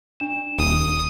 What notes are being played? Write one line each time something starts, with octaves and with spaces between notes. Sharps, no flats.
D4 E7
D#1 D#6